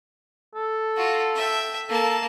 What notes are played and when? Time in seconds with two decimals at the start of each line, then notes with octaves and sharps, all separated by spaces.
0.55 A4
0.97 F4 F#4
1.35 E5 G5
1.89 A#3 A4 A5